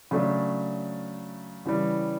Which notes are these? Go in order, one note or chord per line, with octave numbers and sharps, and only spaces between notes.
C#3 F#3 A3 D4
C#3 E3 G3